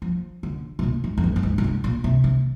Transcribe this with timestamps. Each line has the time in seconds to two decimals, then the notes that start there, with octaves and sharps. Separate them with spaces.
0.02 F3
0.43 D3
0.79 C3
0.83 A#2
1.04 G#2
1.18 F2
1.24 G2
1.36 G2
1.43 G#2
1.58 A#2
1.64 G#2
1.84 A#2
2.04 C3
2.24 C3